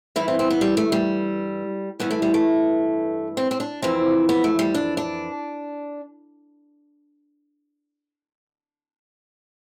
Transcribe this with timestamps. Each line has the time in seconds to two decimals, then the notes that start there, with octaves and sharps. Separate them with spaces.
0.16 G2 E3 E4
0.28 C4
0.39 C4
0.50 B3
0.61 G3
0.77 A3
0.92 G3
1.99 G2 E3 B3
2.11 A3
2.22 G3
2.34 A3
3.37 C4
3.51 C4
3.60 D4
3.82 F2 E3 C4
4.29 B3
4.44 A3
4.59 G3
4.74 D4
4.97 D4